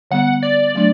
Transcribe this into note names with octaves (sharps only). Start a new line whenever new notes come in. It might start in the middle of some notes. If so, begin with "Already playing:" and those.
D3 G3 B3 F#5
D5
F#3 A3 D4